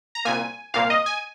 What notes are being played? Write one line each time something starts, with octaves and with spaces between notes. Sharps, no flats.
A#5
C2 A#2 A#3 G#5
C2 A#2 A#3 F5
D#5
G#5